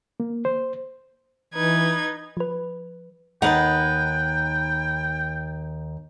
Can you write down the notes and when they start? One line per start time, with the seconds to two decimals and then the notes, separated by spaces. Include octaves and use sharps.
0.20 A#3
0.45 C5
1.54 E3 D#4 B4 G#6
2.37 F3 B4
3.42 D#2 D#4 B4 F#5 G5 A5